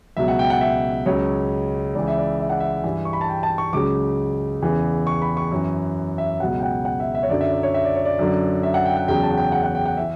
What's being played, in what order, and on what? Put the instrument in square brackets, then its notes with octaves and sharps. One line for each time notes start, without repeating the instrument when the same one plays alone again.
[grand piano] C#2 B2 F#3 E5
F#5
G5
F#5
E5
C#2 C#3 F#3 C#5
C#2 C#3 E3 D5
E5
D5
E5
F#5
E5
G2 E3
C#6
B5
A5
G5
A5
C#6
C#2 C#3 F#3 D6
E2 C#3 E3
C#6
B5
C#6
F#2 E3
E5
C#2 B2 F#3 F#5
G5
F#5
F#5
E5
E5
C#5
F#2 D3 F#3 D5
E5
D5
C#5
E5
D5
C#5
D5
F#2 D3 F#3
E5
F#5
G5
F#5
E2 C#3 F#3 G5
A5
F#5
G5
F#5
F#5
G5
F#5
E3 E5